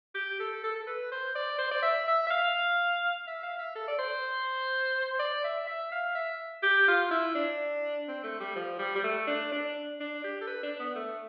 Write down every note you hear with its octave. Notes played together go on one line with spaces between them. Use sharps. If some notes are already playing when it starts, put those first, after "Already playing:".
G4
A4
A4
A4
B4
C5
D5
C5
D5
E5
E5
E5
F5
E5
F5
E5
A4
D5
C5
D5
E5
E5
F5
E5
G4
F4
E4
D4
C4
A3
G3
F3
G3
G3
A3
D4
D4
D4
G4
A4
B4
D4
B3
A3